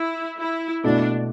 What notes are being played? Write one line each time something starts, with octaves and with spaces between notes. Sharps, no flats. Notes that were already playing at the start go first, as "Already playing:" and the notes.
Already playing: E4
E4
B2 A3 D4 E4